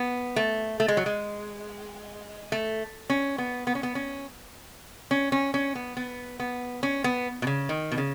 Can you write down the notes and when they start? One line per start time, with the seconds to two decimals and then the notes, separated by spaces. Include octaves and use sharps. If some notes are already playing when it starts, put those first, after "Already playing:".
Already playing: B3
0.36 A3
0.80 A3
0.88 G#3
0.97 F#3
1.06 G#3
2.52 A3
3.10 C#4
3.38 B3
3.67 B3
3.75 C#4
3.83 B3
3.95 C#4
5.11 C#4
5.32 C#4
5.54 C#4
5.75 B3
5.97 B3
6.40 B3
6.83 C#4
7.04 B3
7.42 B2
7.47 C#3
7.69 D#3
7.92 B2
7.98 C#3